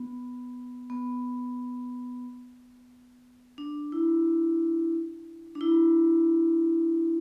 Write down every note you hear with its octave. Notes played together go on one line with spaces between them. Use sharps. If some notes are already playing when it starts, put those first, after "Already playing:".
Already playing: B3
B3
D4
E4
D4
E4